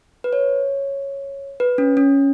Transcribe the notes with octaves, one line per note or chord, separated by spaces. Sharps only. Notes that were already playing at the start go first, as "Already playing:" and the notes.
B4
C#5
B4
C#4
C#4